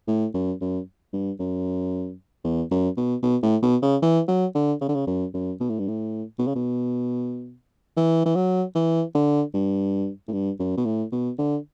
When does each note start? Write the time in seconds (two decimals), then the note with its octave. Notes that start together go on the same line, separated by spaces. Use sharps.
0.08 A2
0.34 F#2
0.61 F#2
1.13 G2
1.39 F#2
2.44 E2
2.71 F#2
2.97 B2
3.23 B2
3.43 A2
3.63 B2
3.83 C#3
4.02 E3
4.28 F#3
4.55 D3
4.81 C#3
4.89 D3
4.95 C#3
5.07 F#2
5.34 F#2
5.60 B2
5.70 A2
5.79 G2
5.88 A2
6.39 B2
6.47 C#3
6.55 B2
7.97 E3
8.26 E3
8.35 F#3
8.75 E3
9.15 D3
9.54 G2
10.28 A2
10.33 G2
10.60 F#2
10.78 B2
10.86 A2
11.12 B2
11.38 D3